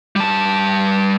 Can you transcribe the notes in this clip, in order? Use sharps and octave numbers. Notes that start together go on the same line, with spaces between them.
G3 A5